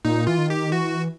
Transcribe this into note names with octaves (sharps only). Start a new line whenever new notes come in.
A#2 D#4
E3 F4
D#3
G4
E3 F#4